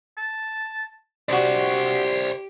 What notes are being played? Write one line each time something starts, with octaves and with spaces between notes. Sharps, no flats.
A5
D4 F#4 G4 C5 D5 C6